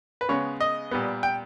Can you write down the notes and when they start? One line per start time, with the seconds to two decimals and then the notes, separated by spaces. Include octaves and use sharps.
0.21 B4
0.29 C#3 G#3 B3 C#5
0.60 D#5
0.91 A#2 G3 B3
1.23 G5